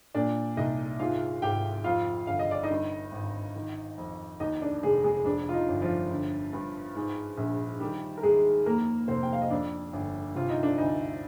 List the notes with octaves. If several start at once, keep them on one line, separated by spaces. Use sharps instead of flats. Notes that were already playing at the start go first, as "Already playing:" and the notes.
A#2 D4 D5
C2 D#4 D#5
G#2 F4 F5
G#1 G4 G5
F2 F4 F5
G1 F5
D#5
D5
D#4 D#5
G2
G#1
D#3
F2
D#2 D#4 D#5
D4 D5
F1 G#3 G#4
G#3 G#4
F2 D4
F4
D#4
G1
F3 F4
D3
G2
G#2
A#1
D#3 G3 G4
A#4
D#2 G#3 G#4
F2 A#3 A#4
F1 C4 C5
G5
F5
D#5
F2 D4 D5
G1
C3 F4
D#4
D4
D2 D#4